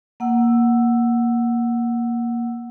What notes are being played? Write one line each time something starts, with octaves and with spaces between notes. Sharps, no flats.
A#3 F#5 E6